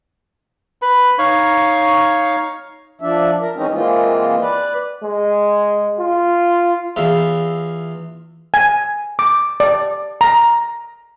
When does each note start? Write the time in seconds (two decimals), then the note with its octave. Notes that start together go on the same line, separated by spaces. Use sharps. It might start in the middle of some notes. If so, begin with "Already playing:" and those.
0.82 B4 B5
1.18 D#4 C#5 F5 C#6
3.01 F3 D4 E5
3.41 A#4
3.56 E3 G#3 C4 C#4 D#4
3.73 E3 G#3 A#3 C4 F4
4.42 B4 D5
5.03 G#3
5.99 F4
6.96 E2 F4 E5
8.54 G#5
9.19 D6
9.60 D5
10.21 A#5